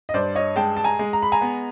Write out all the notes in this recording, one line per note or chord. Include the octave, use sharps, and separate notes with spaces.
D#5
G2 C5 D5
C#5 D#5
G#3 G5 A5
A5
G#5 A#5
G#3
A#5
B5
G#5 A#5
B3